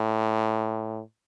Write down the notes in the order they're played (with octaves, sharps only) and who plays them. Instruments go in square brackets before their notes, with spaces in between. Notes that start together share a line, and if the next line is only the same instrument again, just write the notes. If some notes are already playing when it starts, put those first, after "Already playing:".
Already playing: [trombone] A2